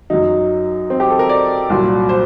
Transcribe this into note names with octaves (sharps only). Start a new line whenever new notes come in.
F#2 F#3 D#4
C4
G4
A4
A#4
D5
C2 A#2 F#3
C5